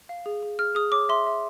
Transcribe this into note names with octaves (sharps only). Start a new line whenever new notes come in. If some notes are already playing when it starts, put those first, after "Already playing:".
F5
G#4
G#4
G#4 F6
G#4 D#6
C#5 D6
E5 C6
E5